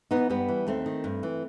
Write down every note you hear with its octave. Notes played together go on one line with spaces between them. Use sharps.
E3 B3 D#4
G2 G3 B3
E3
D#2 A3 C4
D#3
G2
E3